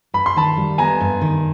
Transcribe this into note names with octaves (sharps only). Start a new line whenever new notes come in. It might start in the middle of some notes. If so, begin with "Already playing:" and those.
G2 B5
C6
D#3 A5 B5
G3
B3 G#5 A#5
G2
D#3